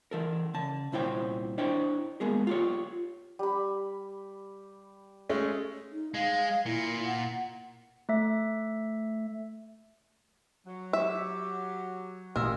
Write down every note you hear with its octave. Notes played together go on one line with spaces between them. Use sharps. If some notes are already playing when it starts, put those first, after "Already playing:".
E3 A4 A#4
C#3 A5
C2 A#2 E4 C5 C#5 G5
D4 E4 C5 C#5 D#5 G5
G#3 A#3 B3 G#4 A#4
F4 G4 C#5
G3 B5
G#3 A3 C#4
D#4
G#3 F5
A#2 E4
F#5
A3 E5
F#3
G4 E5
A1 A#2 A#4 E6